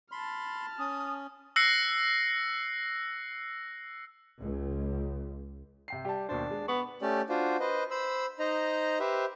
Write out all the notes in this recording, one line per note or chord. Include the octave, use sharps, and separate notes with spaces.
A5 B5 C6 F6
C#4 D#6
E6 F#6 A#6 C7 C#7
C#2
C3 G5 C7
G3 G4 A5
D#2 B2 D4 C5
G#3
B3 C#6
A3 C#4 G4 D5
D4 F4 F#4 C5
B4 C5 D#5
C5 B5 E6
D#4 C5 D#5 A#5
G4 B4 C5 E5